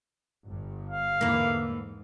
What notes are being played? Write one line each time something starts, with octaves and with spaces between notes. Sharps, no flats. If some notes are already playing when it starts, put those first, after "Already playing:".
G1 G2
F5
E2 G#2 D3 E3 A#3
G#2